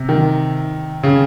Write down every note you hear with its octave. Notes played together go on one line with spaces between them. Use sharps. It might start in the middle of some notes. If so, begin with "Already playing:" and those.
Already playing: C3
D#3
C#3